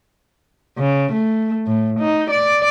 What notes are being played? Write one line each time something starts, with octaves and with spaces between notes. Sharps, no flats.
C#3
A3
A2
D#4
D5